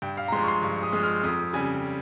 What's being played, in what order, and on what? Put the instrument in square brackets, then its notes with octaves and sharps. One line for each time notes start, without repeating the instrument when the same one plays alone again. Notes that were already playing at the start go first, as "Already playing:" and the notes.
[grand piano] G2 G5
F5
A#5
G#3 C6
F3
C#6
C6
G2 C#6
C#6
D#6
F3 G#3
F6
F2 D#6
C#3 G3 G#5